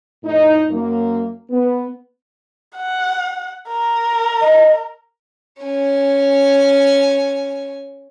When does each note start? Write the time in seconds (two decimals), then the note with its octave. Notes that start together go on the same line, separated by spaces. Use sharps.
0.24 F2 A2 D#4
0.69 F#2 A#3
1.50 B3
2.76 F#5
3.69 A#4
4.41 D#5
5.63 C#4 G#5